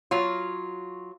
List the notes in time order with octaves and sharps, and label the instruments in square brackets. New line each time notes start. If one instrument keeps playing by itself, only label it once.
[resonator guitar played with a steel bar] F#3 F4